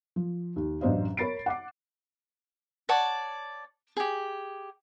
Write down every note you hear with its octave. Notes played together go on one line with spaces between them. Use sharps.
F3
D#2
A1 F#2 D4 C5 D#5 F5
A#4 C#5 B5 A6 C7 D7
F#5 D6 C7
C#5 D5 F#5 A5
G4 G#4